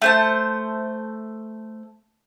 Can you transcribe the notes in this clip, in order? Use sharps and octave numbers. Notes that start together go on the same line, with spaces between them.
A3 C5 A5